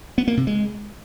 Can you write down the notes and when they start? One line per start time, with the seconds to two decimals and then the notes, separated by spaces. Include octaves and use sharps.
0.18 B3
0.28 A#3
0.37 C3
0.47 G#3